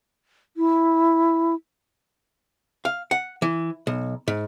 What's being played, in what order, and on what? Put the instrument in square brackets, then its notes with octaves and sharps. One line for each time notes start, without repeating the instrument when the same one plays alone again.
[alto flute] E4
[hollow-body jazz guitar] F5
F#5
E3
B1
G#2